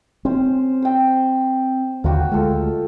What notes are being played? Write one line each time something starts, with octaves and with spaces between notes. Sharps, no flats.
C4 C#4 C5
C5 G5
D#2 D3 A#3 F#4 G5
D2 G#3 F4 A4